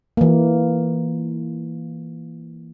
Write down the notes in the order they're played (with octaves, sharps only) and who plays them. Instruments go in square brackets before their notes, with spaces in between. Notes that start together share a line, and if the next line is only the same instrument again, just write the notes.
[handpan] E3 A#3